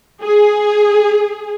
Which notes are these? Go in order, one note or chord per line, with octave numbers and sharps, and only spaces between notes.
G#4